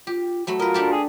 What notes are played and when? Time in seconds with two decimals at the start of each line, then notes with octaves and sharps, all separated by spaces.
0.07 F4 G4
0.47 F#3 A3 F#4 B5
0.59 F4 A#4 B4 D#5
0.74 D4 G4 A4
0.92 G#4